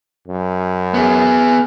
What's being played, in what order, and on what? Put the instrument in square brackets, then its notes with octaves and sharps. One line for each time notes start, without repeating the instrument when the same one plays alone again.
[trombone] F#2
[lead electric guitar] B3 G#4